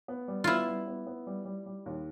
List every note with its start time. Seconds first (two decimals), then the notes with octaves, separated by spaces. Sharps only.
0.08 B3
0.28 G3
0.44 B3 E4 F4
0.67 G3
0.88 B3
1.07 B3
1.27 G3
1.45 G3
1.66 G3
1.86 D#2